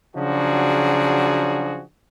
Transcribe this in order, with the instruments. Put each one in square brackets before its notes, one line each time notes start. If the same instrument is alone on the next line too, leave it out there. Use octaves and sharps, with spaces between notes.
[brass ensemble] C#3 F3 F#3 D4 F#4 G#4